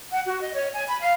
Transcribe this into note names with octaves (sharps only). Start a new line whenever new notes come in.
F#5
F#4
D#5
C#5
G#5
B5
F5